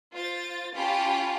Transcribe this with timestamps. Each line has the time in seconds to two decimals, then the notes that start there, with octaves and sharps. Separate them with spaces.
0.14 F4 C5 A6
0.75 C#4 F4 G4 F5 A5 B5